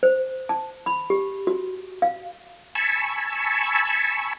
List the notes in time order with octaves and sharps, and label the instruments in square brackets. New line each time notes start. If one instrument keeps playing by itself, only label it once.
[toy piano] C5
A5
B5
G4
F#4
F5
[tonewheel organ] G#5 A5 B5 C#6 E6